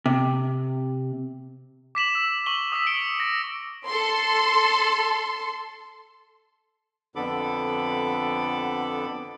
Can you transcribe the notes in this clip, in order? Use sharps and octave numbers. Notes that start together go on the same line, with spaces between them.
C3
D6 B6 E7 F#7
E6 E7
C#6 F#7 G7
D#6 E6 B6
C#7 D7 G7
A#6
A4 C6
F2 D3 B3 A4 B5 D6